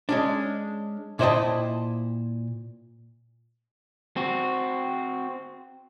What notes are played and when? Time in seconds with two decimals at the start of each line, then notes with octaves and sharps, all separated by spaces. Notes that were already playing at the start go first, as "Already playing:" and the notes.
0.09 G#3 C#4 D4
1.19 A#2 E4 C5 D#5 G5 A5
4.17 C4 F#4